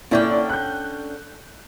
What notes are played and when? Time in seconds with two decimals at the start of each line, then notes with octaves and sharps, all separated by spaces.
0.11 A#2 D3 C#4 E4 D5 G5
0.49 F#6 G6